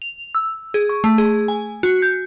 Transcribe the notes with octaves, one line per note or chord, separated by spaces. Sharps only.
F7
E6
G#4
C#6
A3
G#4
G#5
F#4
G6